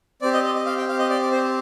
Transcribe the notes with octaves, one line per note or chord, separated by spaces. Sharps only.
C4 G4 D5
D#5
D#5
D#5
F5
G5
F5
D#5
D5
D5
C5